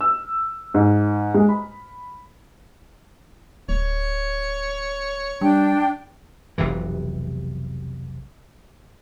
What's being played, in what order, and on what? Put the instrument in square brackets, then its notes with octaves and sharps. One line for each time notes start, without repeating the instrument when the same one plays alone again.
[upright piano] E6
G#2
G#3
B5
[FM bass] D1 [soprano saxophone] C#5
[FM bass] G3 [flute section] D4 G5
[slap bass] F1 B1 C3 E3